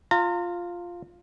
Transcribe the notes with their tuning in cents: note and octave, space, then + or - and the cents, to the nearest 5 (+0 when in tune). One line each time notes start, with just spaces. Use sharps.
F4 +0 A#5 -35